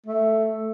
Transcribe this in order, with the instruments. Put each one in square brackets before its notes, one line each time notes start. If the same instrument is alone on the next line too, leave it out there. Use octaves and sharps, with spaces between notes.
[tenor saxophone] A3